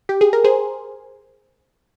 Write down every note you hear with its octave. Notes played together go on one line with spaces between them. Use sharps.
G4
G#4
A#4
G#4 C5